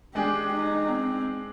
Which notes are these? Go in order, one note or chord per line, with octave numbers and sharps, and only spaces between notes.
G#3 D4 G4 G#4
D#4
C4